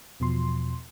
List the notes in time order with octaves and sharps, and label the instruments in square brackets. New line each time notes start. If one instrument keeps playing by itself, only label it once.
[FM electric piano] E2 B2 F3 C6